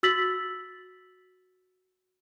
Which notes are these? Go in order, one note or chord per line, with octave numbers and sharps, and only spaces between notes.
F#4 E6 A6 B6 F#7